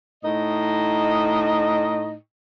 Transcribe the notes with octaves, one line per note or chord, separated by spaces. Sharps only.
A2 D#4 D#5